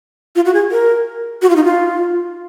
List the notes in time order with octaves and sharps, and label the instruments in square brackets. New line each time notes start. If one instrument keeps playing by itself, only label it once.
[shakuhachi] F4
F#4
G#4
A#4
F#4
F4
D#4
F4